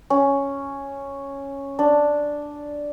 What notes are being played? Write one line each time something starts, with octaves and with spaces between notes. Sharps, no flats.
C#4
D4